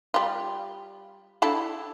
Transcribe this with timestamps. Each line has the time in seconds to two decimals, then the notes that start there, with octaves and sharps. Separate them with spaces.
0.14 G3 F4
1.42 D4 E4 A4